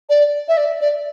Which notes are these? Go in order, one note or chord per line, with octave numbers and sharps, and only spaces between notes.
D5
E5
D5
D5